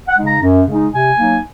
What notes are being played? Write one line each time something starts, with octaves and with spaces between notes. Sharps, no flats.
F#5
C#3 G#3 D#4
A#5
F#2
C#3 G#3 D#4
C3 G#5
F#3 A#3 D#4